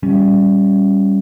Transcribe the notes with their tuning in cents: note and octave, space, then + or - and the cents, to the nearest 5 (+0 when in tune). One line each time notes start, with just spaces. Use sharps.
G3 +0 C#4 +0